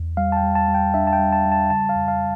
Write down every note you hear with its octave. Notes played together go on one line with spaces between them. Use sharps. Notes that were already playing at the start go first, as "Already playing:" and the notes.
Already playing: E2
G3 F5
A5
G5
G3
A5
G3
G5
D4 E5
A5
G5
G3
A5
G3
A5
C#3 A5
F5
F2
F5